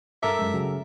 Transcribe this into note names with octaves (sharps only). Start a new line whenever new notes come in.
G2 A4 A#4 E5 D6
F#2 G#3
C#3 F#3 G#4